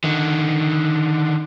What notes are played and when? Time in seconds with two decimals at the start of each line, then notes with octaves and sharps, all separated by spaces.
0.04 D3 D#3